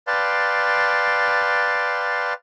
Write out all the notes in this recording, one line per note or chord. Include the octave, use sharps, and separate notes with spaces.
B4 D5 F5 G5 A5 C6